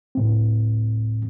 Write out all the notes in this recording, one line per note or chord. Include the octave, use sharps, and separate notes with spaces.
C#2 A2 C4